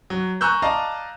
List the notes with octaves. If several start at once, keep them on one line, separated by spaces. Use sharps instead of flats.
F#3
G#5 A#5 C#6 E6 F#6 G6
D5 D#5 F5 A5 A#5